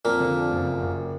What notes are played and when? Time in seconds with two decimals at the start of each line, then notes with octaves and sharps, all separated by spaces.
0.05 F2 A#2 A#3
0.20 D3
0.36 F2
0.51 F#1
0.67 F#1
0.82 F#1